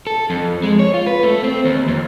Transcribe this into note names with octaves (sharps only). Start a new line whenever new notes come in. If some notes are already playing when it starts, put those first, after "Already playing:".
A4
F2
G#3
C#5
F4
B4
A3
C4
D#2
F2